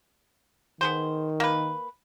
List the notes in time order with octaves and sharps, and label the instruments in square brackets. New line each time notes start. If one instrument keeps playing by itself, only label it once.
[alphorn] D#3 [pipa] B3 G#4 C5
[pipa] A#3 B4